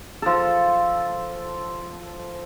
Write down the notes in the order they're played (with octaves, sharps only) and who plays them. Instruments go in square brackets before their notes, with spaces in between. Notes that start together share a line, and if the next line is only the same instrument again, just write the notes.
[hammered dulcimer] F3 A4